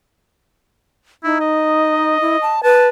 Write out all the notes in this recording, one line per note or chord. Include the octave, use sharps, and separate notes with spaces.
D#4 E4
D#5
E4
A5
B4 A5